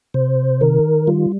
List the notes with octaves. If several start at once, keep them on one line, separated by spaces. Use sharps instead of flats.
C3 C5
D#3 A#4
G3 F4